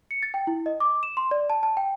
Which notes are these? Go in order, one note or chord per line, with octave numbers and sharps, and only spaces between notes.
C#7
A6
G5
E4
D#5
D6
E7
C6
D5
A5
A5
G5